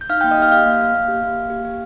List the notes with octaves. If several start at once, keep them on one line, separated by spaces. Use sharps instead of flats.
G6
D#4 F5 F6
A#3 G5 G6
D#5 D#6
G4 F5 F6
G4 F5 F6
A#3
A#3
A#3
G4
A#3
A#3
G4
G4